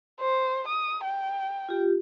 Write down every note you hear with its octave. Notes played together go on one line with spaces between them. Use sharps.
C5
D#6
G5
F4 G4